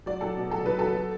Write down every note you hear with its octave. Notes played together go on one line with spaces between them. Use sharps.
F#3 D5
F#3 A4
B2
F#3 A4
F#3 B4
F#3 A4
F#3